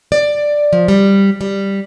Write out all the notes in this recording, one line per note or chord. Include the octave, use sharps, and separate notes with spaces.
D5
F3
G3
G3